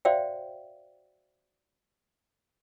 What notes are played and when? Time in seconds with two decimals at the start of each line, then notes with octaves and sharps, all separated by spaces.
0.05 F#4 C5 D5 E5 F5 G5